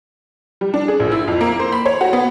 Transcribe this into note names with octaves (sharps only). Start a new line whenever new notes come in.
G3
D4
G#4
A#1
E4
F2
A#3
C5
B5
C#5
F#4
B3